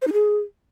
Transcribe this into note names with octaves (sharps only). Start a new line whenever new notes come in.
C5
D#4
G#4